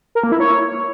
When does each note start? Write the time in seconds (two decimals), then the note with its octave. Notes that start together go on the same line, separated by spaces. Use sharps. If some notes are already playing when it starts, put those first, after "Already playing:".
0.15 A#4
0.24 A#3
0.32 E4
0.40 C#5